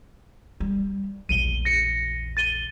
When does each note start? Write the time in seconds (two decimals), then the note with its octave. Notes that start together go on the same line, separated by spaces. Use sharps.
0.60 G3
1.29 A#1 E2 D#7 G7
1.65 A#6 C#7
2.37 A6 D#7 G7